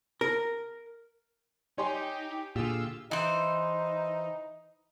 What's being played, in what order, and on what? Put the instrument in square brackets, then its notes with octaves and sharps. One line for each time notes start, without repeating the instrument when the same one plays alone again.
[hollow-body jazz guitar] A#4
[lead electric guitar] D#4 [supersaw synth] G4 [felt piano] C#5 G#5 C6
[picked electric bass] A#2 D3 [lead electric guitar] F4 [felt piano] G4 G#4 [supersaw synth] E6
[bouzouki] E3 C5 [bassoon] D#4